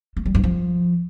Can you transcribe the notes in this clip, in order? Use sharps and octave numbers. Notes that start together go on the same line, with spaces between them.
A3
G3
G2
F3